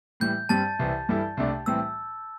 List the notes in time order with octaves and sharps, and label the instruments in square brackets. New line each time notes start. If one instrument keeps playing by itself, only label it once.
[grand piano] A2 E3 G3 [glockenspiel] G6
[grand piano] G2 G3 C4 G4 [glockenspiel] A5 A6
[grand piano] C2 C3 E3
G2 E3 G3 E4 A4
C2 C3 A3 D4
[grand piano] A2 E3 G3 C4 G4 [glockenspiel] E6